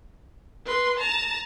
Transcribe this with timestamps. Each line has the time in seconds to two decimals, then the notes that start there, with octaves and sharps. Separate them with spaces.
0.66 B4 C6
0.99 A5 A#5